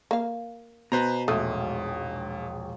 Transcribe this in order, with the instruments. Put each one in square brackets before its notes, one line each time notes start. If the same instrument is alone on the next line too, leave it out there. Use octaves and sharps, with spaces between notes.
[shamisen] A#3 F5
[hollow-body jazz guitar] B2 [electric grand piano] B4 C5 A#5
[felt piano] E1 A#1 D#6 [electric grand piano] G#2 [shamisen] A3